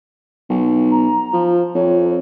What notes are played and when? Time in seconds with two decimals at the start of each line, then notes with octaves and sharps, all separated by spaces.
0.50 B1
0.91 A#5
1.33 F3
1.75 F2 C#5